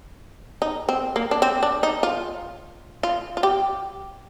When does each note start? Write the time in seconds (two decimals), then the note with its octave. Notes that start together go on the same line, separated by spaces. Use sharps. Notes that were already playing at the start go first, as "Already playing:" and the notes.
0.62 D#4
0.89 C4
1.16 A#3
1.31 D4
1.42 C4
1.63 D4
1.83 D#4
2.03 F4
3.03 F4
3.37 F4
3.43 G4